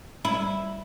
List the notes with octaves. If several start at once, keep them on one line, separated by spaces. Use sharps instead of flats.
E4